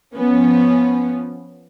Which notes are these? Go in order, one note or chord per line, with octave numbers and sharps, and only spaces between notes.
F3 B3 C#4